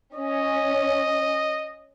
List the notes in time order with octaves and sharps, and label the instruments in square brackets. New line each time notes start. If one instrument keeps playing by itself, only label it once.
[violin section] C#4 [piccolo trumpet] D#5